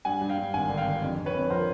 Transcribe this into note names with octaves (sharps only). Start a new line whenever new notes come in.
G2 F#5 G#5
G2
F5 G5
G2
G#1 F#5 G#5
D3
F5 G5
D3
F2
F2
B4 C#5
F2
F3 A#4 C5